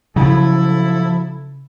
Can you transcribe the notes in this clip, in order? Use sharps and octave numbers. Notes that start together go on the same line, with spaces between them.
C#3 F3 F#3 E4 A4